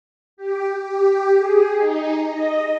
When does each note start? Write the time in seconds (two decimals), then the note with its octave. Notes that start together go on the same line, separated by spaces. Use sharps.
0.37 G4
0.82 G4
1.37 G#4
1.77 D#4
2.23 D#5